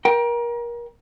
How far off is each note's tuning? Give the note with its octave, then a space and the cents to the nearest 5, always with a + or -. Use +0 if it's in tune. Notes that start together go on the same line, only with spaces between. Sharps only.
A#4 +30 G5 +0